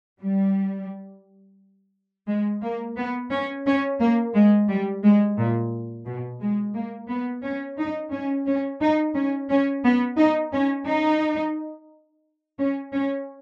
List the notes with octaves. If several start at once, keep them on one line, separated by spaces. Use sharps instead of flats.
G3
G#3
A#3
B3
C#4
C#4
A#3
G#3
G3
G#3
A#2
B2
G#3
A#3
B3
C#4
D#4
C#4
C#4
D#4
C#4
C#4
B3
D#4
C#4
D#4
C#4
C#4